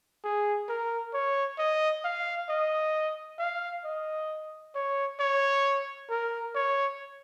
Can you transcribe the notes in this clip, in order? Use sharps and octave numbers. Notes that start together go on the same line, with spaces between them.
G#4
A#4
C#5
D#5
F5
D#5
F5
D#5
C#5
C#5
A#4
C#5